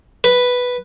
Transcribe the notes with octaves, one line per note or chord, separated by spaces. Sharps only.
B4